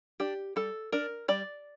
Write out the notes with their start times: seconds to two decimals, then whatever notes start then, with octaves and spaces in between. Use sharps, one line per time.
0.20 D4 G4
0.56 G3 A4
0.92 D4 A#4
1.28 G3 D5